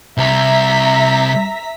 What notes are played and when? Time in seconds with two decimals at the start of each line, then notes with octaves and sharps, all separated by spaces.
0.18 C2 E5 A#5 B6